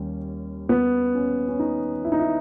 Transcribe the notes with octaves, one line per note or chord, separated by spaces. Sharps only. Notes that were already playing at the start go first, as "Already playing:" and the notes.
Already playing: D#2 G3 C#4
B3
C#4
C#4
D#4
E4
D#4
E4